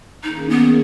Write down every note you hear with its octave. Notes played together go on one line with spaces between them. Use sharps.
D#3 A#3 C#4 D#4 G#4
B3